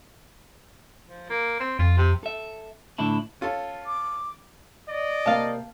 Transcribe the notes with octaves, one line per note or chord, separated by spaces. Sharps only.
F3
A#3
C4
F2 F4
C3
A4 E5
A2 D3 E4 A5
C#4 F4 A4
D6
D5 D#5
C3 A#3 C4 F5 A5